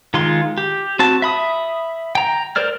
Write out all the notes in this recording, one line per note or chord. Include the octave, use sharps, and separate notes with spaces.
D#3 G#3 F4 C6
G4
C4 F#4 A5
E5 B5 D#6
G5 A#5
A#4 C5 D5 F6